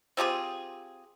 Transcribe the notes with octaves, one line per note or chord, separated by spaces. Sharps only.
C4 F4 G4 G#4